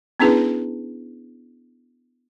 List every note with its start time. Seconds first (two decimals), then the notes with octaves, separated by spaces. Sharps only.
0.20 B3 C#4 D4 E4 G#4 B4